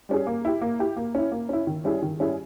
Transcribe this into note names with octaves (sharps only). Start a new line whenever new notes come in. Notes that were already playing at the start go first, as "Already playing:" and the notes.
G3 C#4 G#4
A#3
E4 G4
A#3
E4 G4
A#3
C#4 E4
A#3
C#4 E4
D#3
G3 C#4 E4 G#4
D#3
G3 C#4 E4 G#4